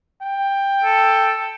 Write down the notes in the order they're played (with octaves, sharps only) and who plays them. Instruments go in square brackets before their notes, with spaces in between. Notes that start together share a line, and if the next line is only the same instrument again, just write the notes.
[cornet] G5
[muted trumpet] A4